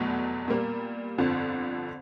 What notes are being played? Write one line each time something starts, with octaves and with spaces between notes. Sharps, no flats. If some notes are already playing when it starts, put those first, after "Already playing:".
Already playing: F1 E2 B2 F#3 A3 B3
A#2 G3 A#3
G1 F2 D3 F3 C4